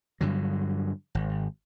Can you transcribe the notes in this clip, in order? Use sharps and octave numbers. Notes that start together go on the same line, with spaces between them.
G2 D3 F#3
G#1